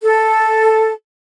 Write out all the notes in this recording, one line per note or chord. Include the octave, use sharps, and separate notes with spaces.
A4